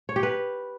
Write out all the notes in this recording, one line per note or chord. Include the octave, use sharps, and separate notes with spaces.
C#5
G4
B4